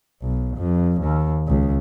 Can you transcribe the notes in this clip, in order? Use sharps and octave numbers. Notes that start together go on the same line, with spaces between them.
B1
F2
D#2
C#2